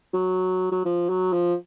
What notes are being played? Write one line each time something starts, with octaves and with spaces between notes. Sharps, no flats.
F#3
F#3
F3
F#3
F3